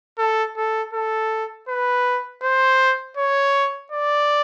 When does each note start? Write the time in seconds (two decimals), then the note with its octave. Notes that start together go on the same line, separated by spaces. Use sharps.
0.18 A4
0.57 A4
0.94 A4
1.68 B4
2.42 C5
3.17 C#5
3.92 D5